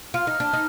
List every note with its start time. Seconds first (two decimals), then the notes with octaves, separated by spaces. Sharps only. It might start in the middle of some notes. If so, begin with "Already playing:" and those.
0.14 F4 F6
0.27 D#4
0.40 D4
0.53 D#4